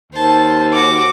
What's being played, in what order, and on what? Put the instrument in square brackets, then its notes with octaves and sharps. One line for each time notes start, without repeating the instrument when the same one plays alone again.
[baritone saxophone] D#2 [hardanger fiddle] C5 A5
[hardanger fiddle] F#4 [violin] D6